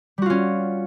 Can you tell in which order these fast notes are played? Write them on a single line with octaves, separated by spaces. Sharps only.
G3 F#4 F4 C#4